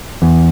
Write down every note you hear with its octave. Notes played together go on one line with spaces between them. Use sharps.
E2